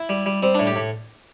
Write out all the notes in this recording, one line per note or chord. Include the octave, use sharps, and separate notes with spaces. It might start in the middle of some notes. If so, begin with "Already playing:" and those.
Already playing: E4
G3
G3
G3 C4
A2 D4
G4
A2